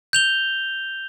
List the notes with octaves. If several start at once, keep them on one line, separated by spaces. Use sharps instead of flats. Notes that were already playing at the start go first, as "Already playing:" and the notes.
G6 F7 G7